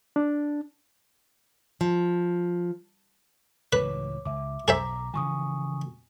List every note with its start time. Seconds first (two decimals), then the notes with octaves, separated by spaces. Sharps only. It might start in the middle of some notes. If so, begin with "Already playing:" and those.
0.16 D4
1.81 F3
3.73 C#2 A2 E3 B4 C#5 D6
4.25 C#2 E5 D6
4.68 B1 G#4 C5 E5 A#5 D6
5.14 C#3 E3 F3 G#5 C#6 D#6